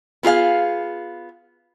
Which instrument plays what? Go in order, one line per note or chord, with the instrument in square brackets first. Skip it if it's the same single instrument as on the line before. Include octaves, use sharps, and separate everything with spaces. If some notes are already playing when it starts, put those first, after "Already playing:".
[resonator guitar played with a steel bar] B3 F4 G#4 F5